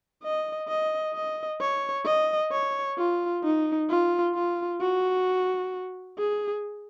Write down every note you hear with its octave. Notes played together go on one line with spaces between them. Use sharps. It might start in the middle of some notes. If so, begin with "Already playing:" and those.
D#5
D#5
D#5
C#5
D#5
C#5
F4
D#4
F4
F4
F#4
G#4